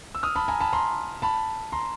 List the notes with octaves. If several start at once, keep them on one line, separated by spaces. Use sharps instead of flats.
E6
D#6 F6
A5 B5
G#5 A#5
A5 B5
A#5 C6
A5 B5
A#5 C6